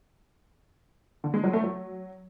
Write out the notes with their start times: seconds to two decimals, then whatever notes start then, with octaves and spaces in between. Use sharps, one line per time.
1.24 D3
1.34 G#3
1.44 F#3
1.53 A3
1.63 F#3